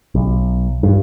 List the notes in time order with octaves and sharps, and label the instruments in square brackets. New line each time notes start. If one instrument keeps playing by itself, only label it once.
[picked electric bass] B1
G2